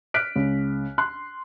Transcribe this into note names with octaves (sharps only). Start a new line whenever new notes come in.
F6 F#6 B6 D7
C#2
C6 F#6